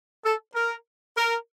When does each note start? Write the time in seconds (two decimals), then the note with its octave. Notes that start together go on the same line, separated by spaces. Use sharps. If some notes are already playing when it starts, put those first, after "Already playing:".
0.24 A4
0.54 A#4
1.16 A#4